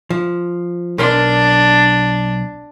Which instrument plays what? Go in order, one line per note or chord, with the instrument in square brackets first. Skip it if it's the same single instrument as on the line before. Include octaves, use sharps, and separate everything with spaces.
[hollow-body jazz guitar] F3
[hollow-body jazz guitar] B1 A#4 C6 [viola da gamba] D4